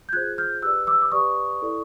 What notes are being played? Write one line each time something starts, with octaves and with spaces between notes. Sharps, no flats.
G6
F4 G#4 C5 F#6 G#6
F6 G6
G4 B4 D5 E6 F#6
D6 E6
D6
G4 B4 D5 C#6 D#6
E4 A4 D5